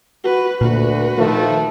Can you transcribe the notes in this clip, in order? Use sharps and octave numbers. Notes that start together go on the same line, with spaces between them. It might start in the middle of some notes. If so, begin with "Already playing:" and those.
F#4 B4
D2 A#2 F#4 B4
D#3 F3 A3